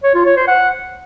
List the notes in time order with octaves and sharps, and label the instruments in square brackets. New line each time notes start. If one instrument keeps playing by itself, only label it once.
[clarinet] C#5
F4
C#5
C5
F#5